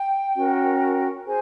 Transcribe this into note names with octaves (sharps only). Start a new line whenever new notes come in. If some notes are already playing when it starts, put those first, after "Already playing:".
Already playing: G5
C#4 F#4 A#4
G#4 C5 G#5